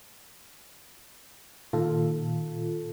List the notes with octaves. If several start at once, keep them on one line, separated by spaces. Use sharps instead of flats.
A#2 D#3 F4 A4